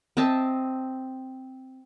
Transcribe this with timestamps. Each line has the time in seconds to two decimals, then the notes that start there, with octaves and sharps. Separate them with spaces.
0.17 C4 D#5 E5 A5